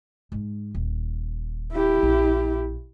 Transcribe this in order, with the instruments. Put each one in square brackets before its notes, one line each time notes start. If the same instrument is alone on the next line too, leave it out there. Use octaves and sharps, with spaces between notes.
[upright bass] G#2 G#3
D#1
[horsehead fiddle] E4 G4
[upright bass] A#1